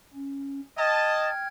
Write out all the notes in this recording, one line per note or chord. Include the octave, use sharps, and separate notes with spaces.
C#4
D#5 G5 A5 F6 G#6